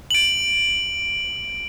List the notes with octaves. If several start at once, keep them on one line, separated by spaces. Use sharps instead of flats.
D7 F#7